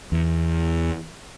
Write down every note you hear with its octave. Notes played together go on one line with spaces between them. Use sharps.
E2